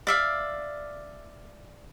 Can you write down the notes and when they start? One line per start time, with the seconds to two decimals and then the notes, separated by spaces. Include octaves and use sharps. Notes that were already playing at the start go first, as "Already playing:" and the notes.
0.07 D5 E5 F5